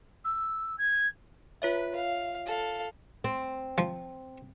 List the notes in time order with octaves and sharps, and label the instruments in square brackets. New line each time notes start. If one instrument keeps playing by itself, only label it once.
[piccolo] E6
G#6
[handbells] F4 C#5 E5 [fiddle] B4
[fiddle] F5
A4 F5
[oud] C4
[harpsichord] F3